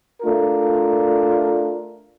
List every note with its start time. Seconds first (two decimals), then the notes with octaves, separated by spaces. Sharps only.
0.21 A3 D4 F4 A#4